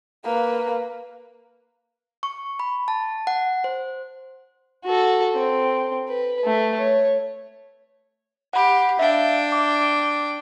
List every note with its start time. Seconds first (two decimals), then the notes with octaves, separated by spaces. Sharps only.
0.25 A#3 B4
2.23 C#6
2.59 B5
2.88 A5
3.27 F#5
3.64 C5
4.85 F#4 A4
5.35 C4
6.09 B4
6.45 A3
6.77 C#5
8.53 G4 F#5 B5
8.99 D4 E5 F5 G5
9.52 D6